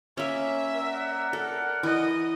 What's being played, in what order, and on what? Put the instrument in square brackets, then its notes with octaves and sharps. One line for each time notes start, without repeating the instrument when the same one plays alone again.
[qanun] A#3 C#4 [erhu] E5
[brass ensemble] A#4 D5 F#5
[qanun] A4
[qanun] E3 [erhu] D#5